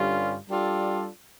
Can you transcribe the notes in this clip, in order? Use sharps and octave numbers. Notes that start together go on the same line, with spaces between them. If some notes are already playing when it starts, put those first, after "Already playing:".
Already playing: G2 D3 G3 C#4 F4
G3 D4 F4 A4 D5